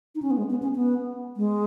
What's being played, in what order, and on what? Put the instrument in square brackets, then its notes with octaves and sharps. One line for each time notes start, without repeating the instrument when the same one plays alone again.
[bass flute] D#4
C#4
B3
G#3
B3
C#4
B3
G#3